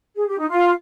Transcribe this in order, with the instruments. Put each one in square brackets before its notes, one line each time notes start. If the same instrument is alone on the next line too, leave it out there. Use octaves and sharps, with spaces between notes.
[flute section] G#4
G4
D#4
F4